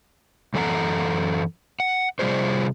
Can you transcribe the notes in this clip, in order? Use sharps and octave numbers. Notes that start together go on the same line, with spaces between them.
F#2 E3 A4 F#5 A#5
F#5
C3 G3 F4 G#4 C5